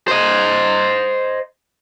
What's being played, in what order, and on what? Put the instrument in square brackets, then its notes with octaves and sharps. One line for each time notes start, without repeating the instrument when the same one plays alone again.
[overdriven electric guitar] C5 D#5